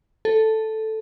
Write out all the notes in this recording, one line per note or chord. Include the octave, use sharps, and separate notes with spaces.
A4